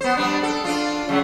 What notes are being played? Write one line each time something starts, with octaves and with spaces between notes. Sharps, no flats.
B3 C5
G3 D4
A4
D4 F4
C#3 F#3 A3